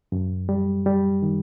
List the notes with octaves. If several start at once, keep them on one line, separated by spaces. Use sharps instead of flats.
F#2
G3
G3
D#3